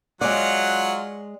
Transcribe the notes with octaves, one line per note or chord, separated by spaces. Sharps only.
F#3 G#3 F4 C#5 D5 F#5